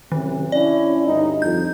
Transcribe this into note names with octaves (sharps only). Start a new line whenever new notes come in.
A1 F#2 C3 D#3
C#4 D4 E4 D5
D2 G2 D#4
F2 G6